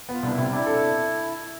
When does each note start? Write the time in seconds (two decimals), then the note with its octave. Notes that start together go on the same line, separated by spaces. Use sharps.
0.09 B3 F4
0.23 C2 D4
0.33 E4
0.38 C3
0.52 D4 E4
0.67 A4